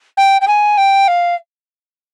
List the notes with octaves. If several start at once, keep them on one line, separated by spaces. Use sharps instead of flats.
G5
G5
G#5
G5
F5